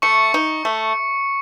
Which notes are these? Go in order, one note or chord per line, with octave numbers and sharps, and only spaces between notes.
A3 C#6 C#7
D#4
A3